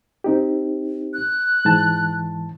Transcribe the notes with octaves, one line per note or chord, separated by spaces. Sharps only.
C4 D#4 G4
F#6
G#2 E3 A5